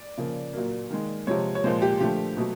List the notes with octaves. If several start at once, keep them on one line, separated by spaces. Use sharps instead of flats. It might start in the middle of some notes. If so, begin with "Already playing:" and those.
Already playing: D5
C#3 F3 A#3
A#2 F#3 A#3
D#3 G#3
C3 F3 G#3 C#5
C#5
A#2 F3 G#3 C5
G4
D3 F3 A3 G4
B2 F#3 A3